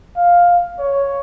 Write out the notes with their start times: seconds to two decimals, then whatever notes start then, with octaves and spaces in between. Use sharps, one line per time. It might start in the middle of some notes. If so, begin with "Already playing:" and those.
0.17 F5
0.79 C#5